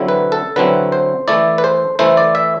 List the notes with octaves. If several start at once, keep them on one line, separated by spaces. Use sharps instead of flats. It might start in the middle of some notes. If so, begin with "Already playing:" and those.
Already playing: D3 F#3 C4 E4
B4
A4
D3 F#3 C4 E4 B4
C5
E3 A3 E4 D5
B4
C5
E3 A3 E4 C5
D5
E5